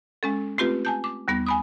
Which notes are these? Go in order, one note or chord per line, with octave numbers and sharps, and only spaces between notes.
G#3 C#4 A4
A3 C4 F4 G4 B4
G#5 A5 G6
D6
D#2 G3 B3 A#6
G#5 B5 D#6